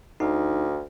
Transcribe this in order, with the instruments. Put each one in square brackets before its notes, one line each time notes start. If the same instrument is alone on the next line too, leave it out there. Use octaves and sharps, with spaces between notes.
[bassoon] D2 [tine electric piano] D#4